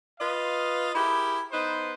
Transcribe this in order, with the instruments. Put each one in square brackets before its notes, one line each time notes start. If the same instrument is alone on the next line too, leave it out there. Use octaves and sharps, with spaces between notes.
[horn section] F4 B4 D#5 F5
E4 G4 G#4 A#4
B3 D#4 B4 C5